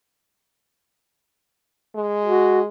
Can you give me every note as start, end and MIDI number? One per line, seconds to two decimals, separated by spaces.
1.95 2.67 56
2.25 2.61 66